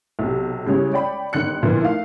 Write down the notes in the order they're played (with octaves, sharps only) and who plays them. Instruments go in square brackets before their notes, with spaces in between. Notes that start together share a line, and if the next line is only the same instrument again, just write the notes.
[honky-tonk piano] B1 C3
C#3 G3 G#3 C#4 E4
C#5 D5 G5 B5
G1 D#3 F#6 C#7
A#2 D3 F3 B3 E4
A3 D#4 F5